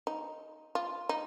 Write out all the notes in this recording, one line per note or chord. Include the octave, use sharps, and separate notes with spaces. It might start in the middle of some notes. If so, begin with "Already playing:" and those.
D#4
F4
D#4